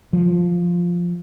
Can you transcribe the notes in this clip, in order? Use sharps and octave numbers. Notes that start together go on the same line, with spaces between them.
F3